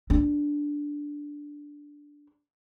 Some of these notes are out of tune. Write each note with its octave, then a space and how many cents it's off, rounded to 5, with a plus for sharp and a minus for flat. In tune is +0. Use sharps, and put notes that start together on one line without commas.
D4 -5